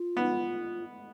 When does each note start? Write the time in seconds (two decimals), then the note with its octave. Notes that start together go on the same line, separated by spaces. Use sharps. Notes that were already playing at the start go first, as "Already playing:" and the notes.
Already playing: F4
0.17 B3